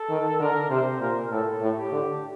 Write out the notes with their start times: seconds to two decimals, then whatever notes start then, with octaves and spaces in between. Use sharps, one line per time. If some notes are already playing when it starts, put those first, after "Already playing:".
Already playing: A4
0.10 D#3
0.40 D3 A#4
0.70 C3 C5
1.01 A#2 A#4
1.31 A2 A4
1.62 A2
1.77 G4
1.92 D3